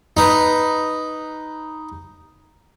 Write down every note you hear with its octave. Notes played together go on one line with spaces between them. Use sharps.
D#4 B4